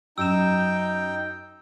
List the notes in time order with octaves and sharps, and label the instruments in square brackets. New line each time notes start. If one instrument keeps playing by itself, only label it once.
[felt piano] F#2 [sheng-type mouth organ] D#4 G5 [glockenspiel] E6 E7